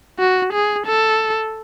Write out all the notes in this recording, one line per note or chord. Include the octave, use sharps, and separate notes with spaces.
F#4
G#4
A4